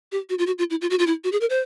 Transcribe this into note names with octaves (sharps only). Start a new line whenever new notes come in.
G4
F#4
F4
F#4
F4
E4
F4
F#4
F4
E4
F#4
G#4
A#4
C5